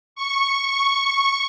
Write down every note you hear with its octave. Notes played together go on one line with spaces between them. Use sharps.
C#6